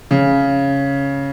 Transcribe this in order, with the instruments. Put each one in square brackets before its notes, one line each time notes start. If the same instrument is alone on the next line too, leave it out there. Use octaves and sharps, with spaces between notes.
[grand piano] C#3